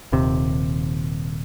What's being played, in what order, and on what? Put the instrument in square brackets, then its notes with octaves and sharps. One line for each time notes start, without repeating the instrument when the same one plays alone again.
[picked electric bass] D#1 D#2 C3